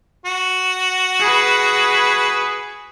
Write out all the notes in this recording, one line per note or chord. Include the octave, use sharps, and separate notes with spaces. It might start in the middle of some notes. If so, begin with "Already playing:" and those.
F#4
G#4 B4